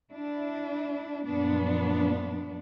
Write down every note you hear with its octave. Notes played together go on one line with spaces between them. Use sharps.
D4 E4
F#2 A#2 F3 B3 D4